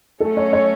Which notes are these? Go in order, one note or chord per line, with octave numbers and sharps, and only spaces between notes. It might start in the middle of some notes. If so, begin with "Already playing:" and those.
F#3 A3 C#4 A4
C#5
C#5